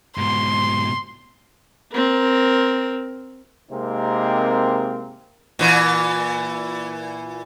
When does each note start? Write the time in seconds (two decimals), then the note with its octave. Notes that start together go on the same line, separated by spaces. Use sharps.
0.18 G#2 B2 C6
1.93 C4 A#4
3.70 C3 G#3 A#3 C4 D#4 A#4
5.59 A#2 E3